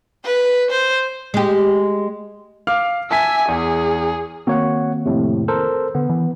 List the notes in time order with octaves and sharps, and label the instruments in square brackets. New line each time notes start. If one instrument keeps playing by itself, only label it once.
[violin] B4
C5
[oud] G#3 G4
[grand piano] F5 D6 F6
[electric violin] E5 G#5 [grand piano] A5 B6
[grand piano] E2 [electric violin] G#4
[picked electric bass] D#3 A#3 C4 [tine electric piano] F#4 C#5 F#5
[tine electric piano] F2 A2 C3
A4 A#4 C5
[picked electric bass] D3 [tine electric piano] B3
[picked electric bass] E3